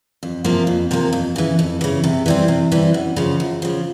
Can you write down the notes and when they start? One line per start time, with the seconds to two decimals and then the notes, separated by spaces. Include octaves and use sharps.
0.23 F2
0.44 C3 F3 A#3
0.67 F2
0.91 C3 F3 A#3
1.12 F2
1.36 C#3 E3
1.59 F2
1.81 C#3 E3
2.04 C3
2.26 E3 G3 C4
2.48 C3
2.72 E3 G3 C4
2.94 F#2
3.16 C#3 F3
3.40 F#2
3.62 C#3 F3